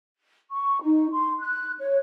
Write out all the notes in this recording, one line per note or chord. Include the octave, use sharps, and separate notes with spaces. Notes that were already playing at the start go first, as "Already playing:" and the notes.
C#6
D#4
C6
F#6
C#5